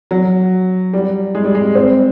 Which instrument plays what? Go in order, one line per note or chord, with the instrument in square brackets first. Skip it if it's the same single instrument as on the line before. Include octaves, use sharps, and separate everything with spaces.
[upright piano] F#3
G3
G#3
G3
G#3
C4